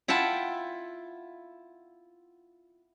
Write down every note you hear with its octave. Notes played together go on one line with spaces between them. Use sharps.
E4 F4 F#5 G5 A5